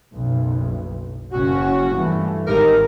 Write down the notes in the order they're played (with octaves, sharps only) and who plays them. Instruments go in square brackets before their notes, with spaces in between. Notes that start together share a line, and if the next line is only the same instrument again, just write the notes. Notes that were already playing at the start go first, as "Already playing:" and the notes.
[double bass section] F#1 B1
[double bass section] F#1 C#4 [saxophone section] F#4
[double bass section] G2 E3 A3
[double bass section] G#1 [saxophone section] D#4 G4 A#4